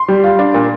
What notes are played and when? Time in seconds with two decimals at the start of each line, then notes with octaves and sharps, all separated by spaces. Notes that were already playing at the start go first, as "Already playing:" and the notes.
Already playing: C6
0.08 G3
0.24 F4
0.39 D4
0.54 A#2